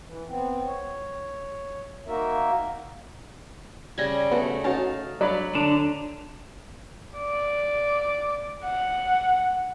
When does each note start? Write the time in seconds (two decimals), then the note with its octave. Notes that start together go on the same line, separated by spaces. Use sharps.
0.05 E3
0.28 B3 C4
0.66 C#5
2.07 A#3 D#4 F#4 A#4 E5
3.98 C#3 G3 G#6 A#6
4.31 A3 B3 F#4
4.64 C#4 D#4 F#4 F5 A5
5.21 F#3 D5 B5
5.55 D3 D4
7.19 D5
8.65 F#5